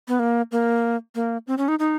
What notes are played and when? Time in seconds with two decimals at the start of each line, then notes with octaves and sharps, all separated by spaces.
0.08 B3
0.19 A#3
0.52 A#3
1.15 A#3
1.47 C4
1.58 C#4
1.68 D#4
1.79 D#4